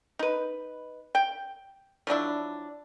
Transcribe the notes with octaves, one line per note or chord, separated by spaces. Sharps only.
D#4 B4
G5
F3 F#3 D4 E4